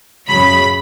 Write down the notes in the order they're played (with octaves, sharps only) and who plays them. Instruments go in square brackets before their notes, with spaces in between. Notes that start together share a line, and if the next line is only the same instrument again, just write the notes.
[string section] F#2 C#3 F#3 B5